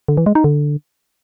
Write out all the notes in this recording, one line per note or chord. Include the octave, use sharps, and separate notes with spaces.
D3
E3
G#3
D#4
D3